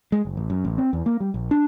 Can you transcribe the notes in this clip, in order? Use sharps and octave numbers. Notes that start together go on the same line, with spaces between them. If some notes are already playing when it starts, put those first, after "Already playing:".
G#3
F#1
A1
F#2
A1
C4
E2
A#3
G3
A#1
D4